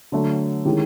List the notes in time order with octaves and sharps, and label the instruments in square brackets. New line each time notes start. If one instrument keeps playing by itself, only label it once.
[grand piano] D3 F#3 A3
D#3 G#3 C#4 E4 G4